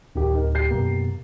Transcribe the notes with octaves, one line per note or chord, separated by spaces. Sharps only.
D1 D#3 G4
D#4 A#4
G4 G6 C7
F#2 B2 A#3